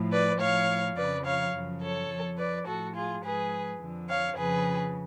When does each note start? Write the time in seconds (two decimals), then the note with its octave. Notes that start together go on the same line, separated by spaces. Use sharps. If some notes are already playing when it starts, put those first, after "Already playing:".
Already playing: A2 F3
0.11 B4 D5
0.40 A2 F3 C#5 F5
0.97 F2 C#3 F3 B4 D5
1.25 C#5 F5
1.54 F#2 C#3 F3
1.82 A4 C#5
2.10 F2 F3
2.38 B4 D5
2.67 A2 F3 F#4 A4
2.95 F4 G#4
3.23 G#2 F3 G#4 B4
3.80 F2 D3 F3
4.09 C#5 F5
4.37 F2 C#3 F3 G#4 B4